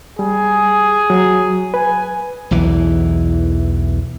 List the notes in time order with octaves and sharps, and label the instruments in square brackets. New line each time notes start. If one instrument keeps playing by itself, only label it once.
[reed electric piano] G3 [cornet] G#4
[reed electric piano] F#3
[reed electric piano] B4 [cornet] G#5
[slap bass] B1 E2 E3